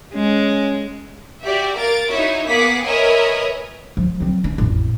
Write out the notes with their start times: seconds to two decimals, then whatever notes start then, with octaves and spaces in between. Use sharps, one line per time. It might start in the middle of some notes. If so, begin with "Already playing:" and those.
0.14 G#3 C#4
1.43 F#4 G4 D5 E5
1.76 A#3 A#4 A6 D7
2.09 D#4 E4 F#4 C#5 E5
2.47 A#3 B3 G#4 F#5 D6 B6
2.84 A#4 B4 C#5 D#5 E5 G#5
3.97 F3
4.20 F#3 C4
4.43 C#4 D4
4.58 A1 F2